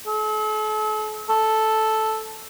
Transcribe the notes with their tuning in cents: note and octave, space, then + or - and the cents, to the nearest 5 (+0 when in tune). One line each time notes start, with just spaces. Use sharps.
A4 -40
A4 -5